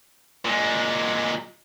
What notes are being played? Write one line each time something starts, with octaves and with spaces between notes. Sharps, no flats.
A#2 G#3